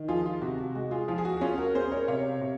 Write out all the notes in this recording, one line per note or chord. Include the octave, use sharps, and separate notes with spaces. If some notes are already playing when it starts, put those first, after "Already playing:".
Already playing: D#3
F3 F4 G#4
F4
C3 F#4
F#4
G#3 F#4
F4 G#4
F3 F4 G#4
G#4
F#4
C#4 F4 G#4
F#4 A#4
C#4 G#4 C5
A#4 C#5
C3 C#5 F5
C3